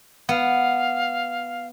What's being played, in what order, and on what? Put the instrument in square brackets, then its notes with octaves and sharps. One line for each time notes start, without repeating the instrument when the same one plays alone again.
[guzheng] B3 [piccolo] F5